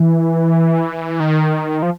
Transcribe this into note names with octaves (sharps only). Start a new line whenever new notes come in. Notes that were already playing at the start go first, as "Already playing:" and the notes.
Already playing: E3
D#3
F3